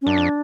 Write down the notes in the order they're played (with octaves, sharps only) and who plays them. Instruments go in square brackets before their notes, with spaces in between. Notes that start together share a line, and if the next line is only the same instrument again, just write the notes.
[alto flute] C#4
[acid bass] F#2 [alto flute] D4
[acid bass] F2